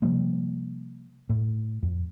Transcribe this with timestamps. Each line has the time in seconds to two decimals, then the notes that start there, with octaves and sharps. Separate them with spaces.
0.02 C3 F3 G3 A#3
1.29 A2
1.83 F2